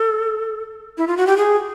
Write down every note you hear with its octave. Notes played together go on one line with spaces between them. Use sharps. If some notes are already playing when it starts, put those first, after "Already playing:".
Already playing: A4
E4
F4
F#4
G4
G#4